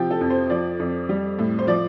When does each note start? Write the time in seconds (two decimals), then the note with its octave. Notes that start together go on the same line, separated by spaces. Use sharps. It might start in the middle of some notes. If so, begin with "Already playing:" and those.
Already playing: C3 F3 G4
0.10 A4
0.21 F2
0.30 C5
0.50 F3 D5
0.79 F2
1.09 G3
1.39 A2
1.59 C5
1.67 F3 D5